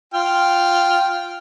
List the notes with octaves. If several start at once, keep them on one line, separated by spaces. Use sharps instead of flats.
F4 G5 F6